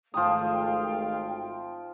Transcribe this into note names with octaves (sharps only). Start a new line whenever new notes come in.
G#1 F3 A3 F5 G5 D#6